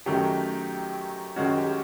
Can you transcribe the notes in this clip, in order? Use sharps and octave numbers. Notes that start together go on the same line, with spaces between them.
F#2 D#3 F#3 A3 G4
F#2 D#3 G#3 C#4 F#4
G4